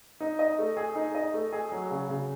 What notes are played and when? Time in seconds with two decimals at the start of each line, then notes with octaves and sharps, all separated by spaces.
0.20 D#4
0.39 D#5
0.59 A3
0.77 G#4
0.96 D#4
1.15 D#5
1.34 A3
1.52 G#4
1.72 F#3
1.91 C#3
2.09 C#3